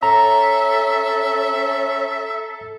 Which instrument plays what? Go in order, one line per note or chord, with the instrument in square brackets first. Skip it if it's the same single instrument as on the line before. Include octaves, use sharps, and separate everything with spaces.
[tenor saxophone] C#4 [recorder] A4 [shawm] E5 [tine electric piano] A#5